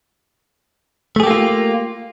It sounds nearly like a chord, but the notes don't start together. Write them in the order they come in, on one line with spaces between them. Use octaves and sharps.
A3 G#4 G4 A#3 F4